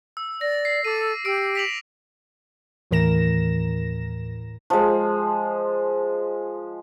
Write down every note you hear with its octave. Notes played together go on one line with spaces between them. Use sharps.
E6
D5 A#6
C7
A4 D6 D#7
G4 E6 D7
B6 F7 F#7
D#2 A2 E3 A#4 A#6 E7
F3 G#3